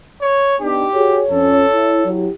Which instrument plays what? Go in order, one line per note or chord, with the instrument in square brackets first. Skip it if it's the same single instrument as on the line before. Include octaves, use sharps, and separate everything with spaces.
[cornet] C#5
[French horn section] B3 D4 D#4 [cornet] G4
[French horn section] F#4 G#4 [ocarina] C#5
[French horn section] F2 C#4 [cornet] A4
[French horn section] E4
F#3 E4 G4